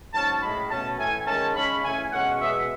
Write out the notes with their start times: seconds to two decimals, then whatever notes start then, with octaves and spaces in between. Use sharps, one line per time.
0.14 G#2 F#3 C#4 A5
0.42 A2 G#3 C#4 B5
0.70 B2 A3 C#4 A5
0.99 A2 E3 A3 G#5
1.26 D#3 G#3 C#4 A5
1.55 C#3 G#3 C#4 B5
1.83 C#3 E3 A3 C#4 G#5
2.12 B2 G#3 C#4 F#5
2.40 B2 G#3 B3 E5